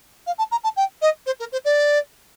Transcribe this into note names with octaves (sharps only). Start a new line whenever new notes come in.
F5
A5
A#5
A5
G5
D#5
C5
A#4
C5
D5